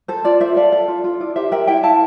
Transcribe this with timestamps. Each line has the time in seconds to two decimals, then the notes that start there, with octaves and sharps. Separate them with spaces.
0.08 A4 C5
0.25 F4 D5
0.41 F4 C5 E5
0.56 A4 D5 F5
0.72 A4
0.88 F4
1.04 F4
1.20 E4 D5
1.36 G4 C5 E5
1.52 A#4 E5 G5
1.67 E4 E5 G5
1.83 E4 F5 A5